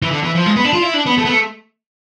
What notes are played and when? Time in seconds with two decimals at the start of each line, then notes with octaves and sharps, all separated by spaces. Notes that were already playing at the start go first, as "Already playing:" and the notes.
0.03 E3
0.11 D3
0.23 E3
0.35 F3
0.46 G#3
0.56 B3
0.65 D4
0.73 F4
0.82 E4
0.94 D4
1.06 B3
1.18 A3
1.25 B3
1.30 A3